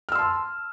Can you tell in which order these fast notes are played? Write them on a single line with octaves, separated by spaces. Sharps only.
F6 E6 C6 A5